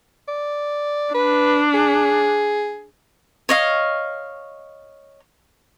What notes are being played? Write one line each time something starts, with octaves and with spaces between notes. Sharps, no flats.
D5
D4 B4
G#4
C#5 D#5 F5